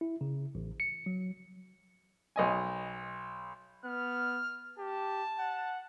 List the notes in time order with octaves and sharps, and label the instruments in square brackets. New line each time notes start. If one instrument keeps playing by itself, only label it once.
[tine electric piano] E4
C#3
A1
C#7
F#3
[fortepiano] B1 D#5 G#5
[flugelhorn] B3 [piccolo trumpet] F6
[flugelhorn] G4 [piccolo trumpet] A5
[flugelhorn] F#5